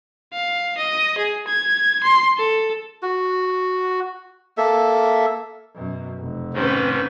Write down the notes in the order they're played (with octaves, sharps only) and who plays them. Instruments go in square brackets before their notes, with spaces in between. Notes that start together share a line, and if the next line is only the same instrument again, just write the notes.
[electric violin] F5
D#5
G#4
G#6
C6
A4
[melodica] F#4
A#3 A4 E5
[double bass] F#2 B2
F1
[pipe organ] G#2 D#3 [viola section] C4 C#4 B4